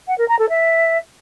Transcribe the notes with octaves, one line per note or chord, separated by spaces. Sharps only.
F#5
A#4
A#5
A4
E5